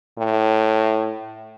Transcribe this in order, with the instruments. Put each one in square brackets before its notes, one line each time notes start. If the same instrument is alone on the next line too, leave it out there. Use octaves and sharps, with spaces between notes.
[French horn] A2